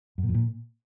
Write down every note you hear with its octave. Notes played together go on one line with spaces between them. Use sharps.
F#2
A#2
F2
A#2